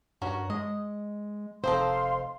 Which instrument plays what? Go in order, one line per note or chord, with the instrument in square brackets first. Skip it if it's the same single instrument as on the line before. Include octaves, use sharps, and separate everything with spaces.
[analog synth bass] G2 [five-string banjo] C#4 F#4 A#4
[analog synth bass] G#3 [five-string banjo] D#5
[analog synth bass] F1 [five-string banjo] C4 D#4 A4 [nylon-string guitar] C5 [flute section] F5 C6